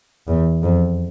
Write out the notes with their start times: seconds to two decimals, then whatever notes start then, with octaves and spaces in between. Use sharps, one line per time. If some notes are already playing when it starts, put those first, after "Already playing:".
0.27 E2
0.63 F2